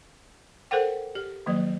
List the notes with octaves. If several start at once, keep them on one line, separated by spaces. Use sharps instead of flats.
A4 A#4 C5 F#5 G5
G4
D#3 F3 F#3 A#3